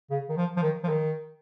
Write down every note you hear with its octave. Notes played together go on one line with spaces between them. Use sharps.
C#3
D#3
F3
F3
D#3
F3
D#3